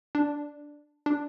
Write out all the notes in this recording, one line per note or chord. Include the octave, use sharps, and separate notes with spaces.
D4
D4